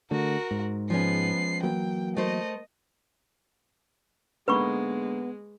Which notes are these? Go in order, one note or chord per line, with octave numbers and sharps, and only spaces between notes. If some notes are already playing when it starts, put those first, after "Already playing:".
D3 A3 F#4 A#4
G#2
F3 G#3 B3 C#4 C7
E3 F#3 A#3 G5
A3 A#4 C5 D#5
G#2 D3 G#3 A#3 B3 B4 B5 C#6